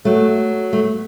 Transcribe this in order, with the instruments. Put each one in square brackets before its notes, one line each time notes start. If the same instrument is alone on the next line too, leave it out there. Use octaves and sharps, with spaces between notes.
[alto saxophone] F#3 [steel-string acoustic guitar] A3
[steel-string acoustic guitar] A3